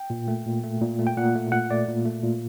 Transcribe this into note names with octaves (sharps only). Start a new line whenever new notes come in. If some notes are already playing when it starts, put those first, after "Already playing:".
Already playing: G5
A#2
A3
A#2
A3
A#2
A3
G5
A#2 F#5
A3
A#2 F#5
A3 D5
A#2
A3
A#2